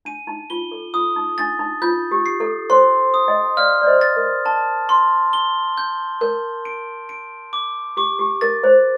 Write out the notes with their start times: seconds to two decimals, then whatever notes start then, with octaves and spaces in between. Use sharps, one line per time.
0.05 D4 D#7
0.27 D#4
0.50 F4 G7
0.71 A4
0.94 F4 D#6
1.16 D#4
1.38 D4 A6
1.59 D#4
1.82 F4 G6
2.11 G4
2.26 C7
2.40 A4
2.70 C5 C6
3.14 D#6
3.28 D#5 G5
3.57 D5 F5 F6
3.81 D5
3.86 C5 D#5
4.01 A6
4.16 A#4
4.46 A5
4.89 C6
5.33 G7
5.78 G6
6.21 A#4 G6
6.65 D7
7.09 D7
7.53 D6
7.97 G4 D6
8.19 G4
8.41 A#4 A6
8.63 C5